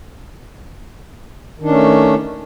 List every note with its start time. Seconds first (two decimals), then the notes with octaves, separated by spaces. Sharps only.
1.60 D#3
1.64 D4
1.68 C#4
1.72 A3